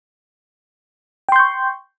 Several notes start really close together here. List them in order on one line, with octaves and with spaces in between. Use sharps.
G5 C6 G6 C#6